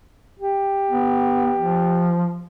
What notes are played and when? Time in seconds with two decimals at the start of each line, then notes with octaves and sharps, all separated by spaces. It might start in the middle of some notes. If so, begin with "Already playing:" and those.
0.39 G4
0.91 B3
1.59 F3